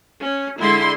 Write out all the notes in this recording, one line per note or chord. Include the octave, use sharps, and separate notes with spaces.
C#4
D3 G#3 E4 C6